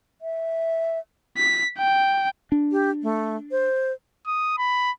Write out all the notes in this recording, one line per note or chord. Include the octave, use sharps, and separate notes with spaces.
E5
B6
G5
D4
G4
A3
C5
D#6
B5